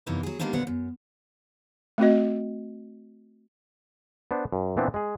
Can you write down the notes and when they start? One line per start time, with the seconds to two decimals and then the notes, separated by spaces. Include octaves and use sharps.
0.06 F#2 C3 E3 A#3 B3 D#4
0.23 F#3 G#4
0.39 G3 G#3 A#3 B3 D4 D#4
0.53 D2 A#2 D3 F#3 B3 F#5
0.67 F#2
1.98 A3 C4 F#4 D#5
4.31 B3 D4 C5
4.52 F#2
4.77 A#2 E3 B3 C4 D4
4.94 G#3 G#4